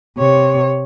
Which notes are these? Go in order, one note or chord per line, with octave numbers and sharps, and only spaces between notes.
C3 C#5